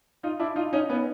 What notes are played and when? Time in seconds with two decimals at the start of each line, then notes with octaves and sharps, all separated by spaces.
0.23 D#4 F4
0.39 D4 E4
0.56 D#4 F4
0.73 C#4 D#4
0.90 B3 C#4